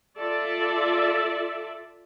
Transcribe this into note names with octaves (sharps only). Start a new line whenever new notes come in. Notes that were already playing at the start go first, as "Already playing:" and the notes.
F4 A4 D5 E5